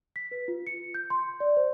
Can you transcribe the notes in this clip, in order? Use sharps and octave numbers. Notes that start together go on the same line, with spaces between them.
B6
B4
F4
C#7
G6
C6
D5
C5